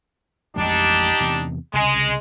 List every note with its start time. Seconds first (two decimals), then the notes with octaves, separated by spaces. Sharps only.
0.56 A1 F2 G#3 D4 D#4 G4
1.20 E2 C3
1.73 C2 C#3 G#3